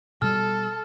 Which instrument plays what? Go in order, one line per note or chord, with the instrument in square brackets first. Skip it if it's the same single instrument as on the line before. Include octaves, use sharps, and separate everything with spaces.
[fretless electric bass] B2 G3 [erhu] A4 [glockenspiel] F6